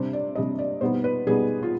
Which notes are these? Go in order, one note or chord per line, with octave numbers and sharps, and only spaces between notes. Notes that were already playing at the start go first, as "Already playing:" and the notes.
Already playing: C3 G3 D4 C5
D5
C3 G3 D4 D#5
D5
B2 G3 B3 D#4 C5
B4
B2 G3 B3 D#4 G#4
F4